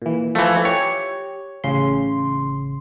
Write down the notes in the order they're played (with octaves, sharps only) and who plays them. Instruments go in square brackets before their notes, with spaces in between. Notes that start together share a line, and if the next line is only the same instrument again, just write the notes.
[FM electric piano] A#2 E3
[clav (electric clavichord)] E3 A3 [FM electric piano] F3
[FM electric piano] G4 [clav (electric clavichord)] C#5
[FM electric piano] A1 C#3 C6